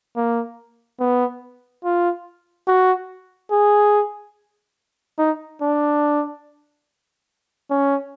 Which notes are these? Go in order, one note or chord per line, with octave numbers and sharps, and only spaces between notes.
A#3
B3
F4
F#4
G#4
D#4
D4
C#4